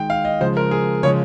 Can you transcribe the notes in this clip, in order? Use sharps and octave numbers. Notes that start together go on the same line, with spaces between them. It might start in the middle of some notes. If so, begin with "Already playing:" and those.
Already playing: D#3 G#3 G5
F5
D#5
C#3 F3 G#3 C5
A#4
G#4
C#3 F3 G#3 C#5